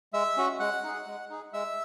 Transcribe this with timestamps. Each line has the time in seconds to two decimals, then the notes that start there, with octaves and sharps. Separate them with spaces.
0.13 G#3 E5 E6
0.37 C#4 F#4
0.60 G#3 F#5 F#6
0.83 D#4 G#4
1.06 G#3
1.30 D#4 G#4
1.53 G#3 E5 E6